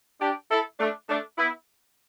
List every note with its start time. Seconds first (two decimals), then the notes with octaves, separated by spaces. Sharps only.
0.21 D4 G4
0.51 E4 A4
0.80 A3 D4
1.09 A3 D4
1.38 B3 E4